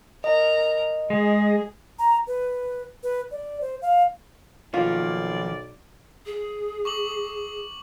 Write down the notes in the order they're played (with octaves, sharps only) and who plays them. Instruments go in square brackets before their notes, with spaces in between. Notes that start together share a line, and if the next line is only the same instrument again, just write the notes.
[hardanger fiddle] A#4 A#5 [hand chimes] D#5
[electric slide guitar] G#3 [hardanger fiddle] G#4
[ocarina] A#5
B4
B4
D5
C5
F5
[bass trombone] B1 [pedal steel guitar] D#3 F3 A#3 [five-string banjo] F4 [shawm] D5
[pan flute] G#4
[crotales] C#6 D6 F#7